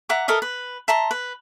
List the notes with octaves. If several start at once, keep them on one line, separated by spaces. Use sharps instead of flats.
E5 F#5 A#5 D6
A4 A#4 D#5 E5
B4
E5 A5 A#5 C6
B4